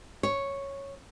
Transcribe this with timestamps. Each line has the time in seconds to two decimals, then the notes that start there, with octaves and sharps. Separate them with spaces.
0.23 C#5